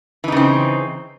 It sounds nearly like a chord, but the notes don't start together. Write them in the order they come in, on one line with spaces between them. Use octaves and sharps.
E3 D#4 C#3 C4